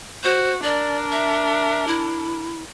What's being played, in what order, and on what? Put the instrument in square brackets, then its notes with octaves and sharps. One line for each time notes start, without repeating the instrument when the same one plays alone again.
[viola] F#4 [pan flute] C5
[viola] D4 A#4 [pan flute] D5
[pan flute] E5
E4